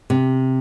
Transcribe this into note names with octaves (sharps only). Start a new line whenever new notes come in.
C3